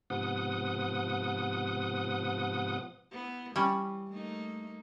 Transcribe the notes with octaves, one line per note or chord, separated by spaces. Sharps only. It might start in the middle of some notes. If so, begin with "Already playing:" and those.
G#2 C3 F3 B3 F#5 D#6
B3 E4
E3 G3 C#4
A3 A#3 D#4